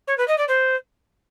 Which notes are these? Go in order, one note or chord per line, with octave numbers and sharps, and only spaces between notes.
C#5
B4
D#5
D5
C5